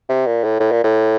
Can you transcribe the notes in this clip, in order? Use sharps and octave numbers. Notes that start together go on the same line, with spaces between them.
C3
A#2
A2
A2
A#2
A2